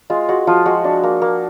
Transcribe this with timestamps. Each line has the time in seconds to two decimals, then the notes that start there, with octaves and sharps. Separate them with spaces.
0.10 G#3 F4
0.29 G#3 F#4
0.47 F3 F4
0.66 G#3 F#4
0.84 D4
1.03 A#3
1.22 A#3